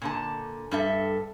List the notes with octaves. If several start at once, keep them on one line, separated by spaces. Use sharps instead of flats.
A#2 D3 A5
G2 A4 E5